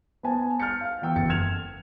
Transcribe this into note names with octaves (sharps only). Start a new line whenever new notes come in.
B3 C5 G#5 A5
F6 G6 A6 C#7
F5
E2 G5 E6
F#1 E2 A6 C#7
F6 G#6 E7 F7